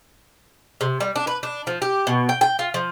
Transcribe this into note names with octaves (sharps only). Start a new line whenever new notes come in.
C3
G3
D4
B4
D4
F3
G4
B2
G5
G5
F4
F3